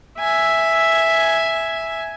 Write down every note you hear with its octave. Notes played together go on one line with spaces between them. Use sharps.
E5 G#5